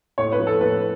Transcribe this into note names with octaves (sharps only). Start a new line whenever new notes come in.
A2 C#5
B4
F3
A4
A2 B4